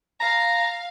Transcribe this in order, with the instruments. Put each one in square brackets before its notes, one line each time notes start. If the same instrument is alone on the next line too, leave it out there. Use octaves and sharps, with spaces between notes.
[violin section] F5 [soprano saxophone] A#5